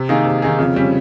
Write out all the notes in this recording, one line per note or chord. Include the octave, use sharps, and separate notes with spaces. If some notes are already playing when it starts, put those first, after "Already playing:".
Already playing: C3
D#3 A#3 D#4 G#4
C3
D#3 A#3 D#4 G#4
F2 C#3
G3 C#4